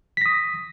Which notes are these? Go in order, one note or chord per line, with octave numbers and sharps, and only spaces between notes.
D#6 A#6 B6